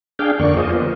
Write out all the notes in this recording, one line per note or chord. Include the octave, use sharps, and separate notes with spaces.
D4 G#4 F5 G5
F2 D3 A#3 D5 C#6
F4 G#4 C5 D#5
F3 A#3 B3